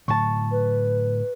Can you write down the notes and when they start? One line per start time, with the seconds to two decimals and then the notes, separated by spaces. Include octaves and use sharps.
0.08 A2 D3 F#3 A5 C#6
0.51 B4